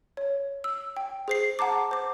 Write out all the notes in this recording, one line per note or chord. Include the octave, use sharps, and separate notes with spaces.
C#5
E6
G5
G#4 C5 C7
F#5 A5 A#5 D6
C5 D6